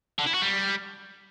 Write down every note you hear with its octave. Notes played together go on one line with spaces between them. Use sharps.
D3
E4
F#4
G3